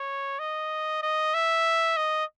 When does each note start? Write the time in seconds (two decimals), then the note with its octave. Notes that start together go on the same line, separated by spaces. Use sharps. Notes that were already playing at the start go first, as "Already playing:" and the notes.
Already playing: C#5
0.39 D#5
1.02 D#5
1.34 E5
1.97 D#5